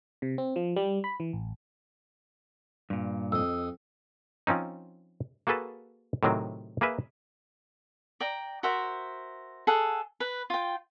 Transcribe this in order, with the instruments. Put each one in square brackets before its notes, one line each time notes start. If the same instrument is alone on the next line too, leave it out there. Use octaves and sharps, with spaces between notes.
[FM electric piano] C3
C4
F3
G3
B5
E3
A1
[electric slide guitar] G2 A#2
[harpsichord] F2 D#5 [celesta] E6
[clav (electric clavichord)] F3 C4 C#4 D#4
A#3 F#4 G#4 A4 B4 A5
A2 C3 D#3 F#3 C4
A#3 G#4 A#4 B4 E5
[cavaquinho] D5 G5 A#5
F#4 A#4 C5 E5
G#4 A4 F#5
B4
F4 G5